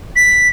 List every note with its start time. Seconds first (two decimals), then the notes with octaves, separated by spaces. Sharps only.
0.16 B6